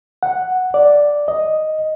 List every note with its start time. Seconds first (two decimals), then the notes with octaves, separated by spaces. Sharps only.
0.23 F#5
0.74 D5
1.28 D#5